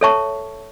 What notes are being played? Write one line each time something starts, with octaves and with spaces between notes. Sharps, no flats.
A4 C#5 E5 A5 C#6